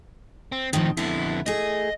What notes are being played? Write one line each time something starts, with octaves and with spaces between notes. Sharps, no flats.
C4
A2 D#3 F3 C4
F2 D3 B3 E4
A3 G#4 D#5